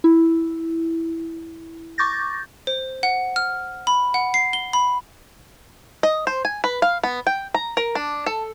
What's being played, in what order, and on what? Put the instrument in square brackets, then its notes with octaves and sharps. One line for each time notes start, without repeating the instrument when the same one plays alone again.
[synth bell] E4
C#6 D6 G6 A6 A#6
[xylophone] C5
F#5
F6
B5
F#5
C7
G7
B5
[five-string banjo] D#5
C5
G#5
B4
F5
B3
G5
A#5
A#4
D4
A4